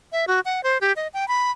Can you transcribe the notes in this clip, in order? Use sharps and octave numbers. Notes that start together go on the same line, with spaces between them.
E5
F#4
F#5
C5
G4
D#5
G5
B5